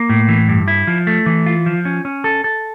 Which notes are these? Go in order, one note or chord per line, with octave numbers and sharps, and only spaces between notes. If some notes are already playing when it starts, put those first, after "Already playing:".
Already playing: A#3
A2
E3
G2
E4
F3
A3
E3
F4
F3
C#4
C#4
A4
A4